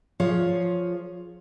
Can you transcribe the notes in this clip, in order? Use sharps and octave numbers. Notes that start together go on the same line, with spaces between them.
F3 F4 G#4 C#5